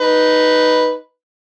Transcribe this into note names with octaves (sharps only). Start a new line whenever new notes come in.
D#4 B4